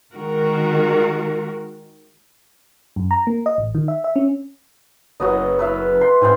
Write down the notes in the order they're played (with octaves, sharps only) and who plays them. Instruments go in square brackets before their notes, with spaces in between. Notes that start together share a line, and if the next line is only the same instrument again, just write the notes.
[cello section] D#3 G#3 F#4 A#4
[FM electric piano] F#2
A#5
A#3
D#5
A1
D#3
E5
E5
C#4
[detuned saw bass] F#1 [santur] F#3 B3 D#5
[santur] B4 E5 F5
C6
[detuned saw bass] G#2 [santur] B3 C4 G#5